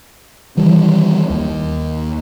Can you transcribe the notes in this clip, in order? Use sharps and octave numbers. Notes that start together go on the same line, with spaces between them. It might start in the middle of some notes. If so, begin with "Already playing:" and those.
D#3 E3 G3
D#2